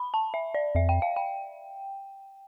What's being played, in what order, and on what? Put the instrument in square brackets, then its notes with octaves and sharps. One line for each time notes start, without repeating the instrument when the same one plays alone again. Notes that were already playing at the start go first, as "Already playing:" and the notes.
Already playing: [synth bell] B5
A5
E5
D5
[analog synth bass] F2 [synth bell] E5
[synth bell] G5
F5
G5